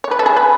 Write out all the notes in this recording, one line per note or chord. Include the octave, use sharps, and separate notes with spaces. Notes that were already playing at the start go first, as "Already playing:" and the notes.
C#5
B4
A4
G#4
B4